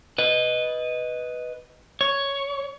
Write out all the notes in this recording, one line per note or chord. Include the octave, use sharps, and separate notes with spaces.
B4 D#5
C#5